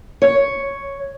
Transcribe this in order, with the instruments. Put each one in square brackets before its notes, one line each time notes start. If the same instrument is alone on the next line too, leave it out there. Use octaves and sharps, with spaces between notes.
[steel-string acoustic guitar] C#5